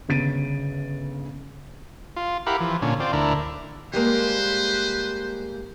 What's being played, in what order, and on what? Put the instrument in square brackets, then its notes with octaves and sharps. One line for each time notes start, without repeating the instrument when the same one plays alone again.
[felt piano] G1 C#3 A6 D7 D#7
[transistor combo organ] F4
E4 G4 A#4 F5 F#5 B5
E3 F3
A#2 D3 C#4
C4 F4 D5
D2 D4 E4 A#4
[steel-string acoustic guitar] G3 G#3 A#3 [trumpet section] B4 C5